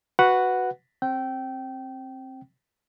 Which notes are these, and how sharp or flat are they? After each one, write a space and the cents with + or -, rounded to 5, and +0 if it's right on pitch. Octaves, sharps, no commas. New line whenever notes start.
F#4 +0 B4 +0 F#5 +0
C4 +20 G5 -20